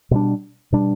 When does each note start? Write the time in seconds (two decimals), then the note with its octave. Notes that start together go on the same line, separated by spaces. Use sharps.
0.11 B2 G3 D4
0.72 B2 G3 D4